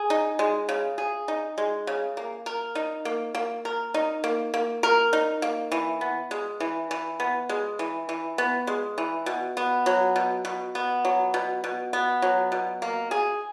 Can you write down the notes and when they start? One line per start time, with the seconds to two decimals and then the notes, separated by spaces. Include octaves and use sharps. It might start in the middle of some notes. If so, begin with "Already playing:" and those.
Already playing: G#4
0.10 D#4
0.39 G#3
0.69 C#3
0.98 G#4
1.28 D#4
1.58 G#3
1.87 C#3
2.17 A#3
2.46 A#4
2.75 D#4
3.05 A#3
3.35 A#3
3.65 A#4
3.94 D#4
4.24 A#3
4.54 A#3
4.83 A#4
5.13 D#4
5.42 A#3
5.72 E3
6.01 B3
6.31 G#3
6.60 E3
6.91 E3
7.20 B3
7.49 G#3
7.79 E3
8.09 E3
8.38 B3
8.67 G#3
8.98 E3
9.26 B2
9.57 B3
9.86 F#3
10.16 B2
10.45 B2
10.75 B3
11.05 F#3
11.34 B2
11.64 B2
11.93 B3
12.22 F#3
12.52 B2
12.82 A#3
13.11 G#4